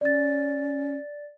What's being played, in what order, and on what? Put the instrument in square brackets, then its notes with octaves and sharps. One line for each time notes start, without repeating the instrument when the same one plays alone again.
[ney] C#4 [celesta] D5 A6